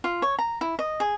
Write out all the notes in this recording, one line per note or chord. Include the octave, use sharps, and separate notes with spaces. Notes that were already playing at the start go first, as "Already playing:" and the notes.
F4
C#5
A#5
E4
D#5
G#4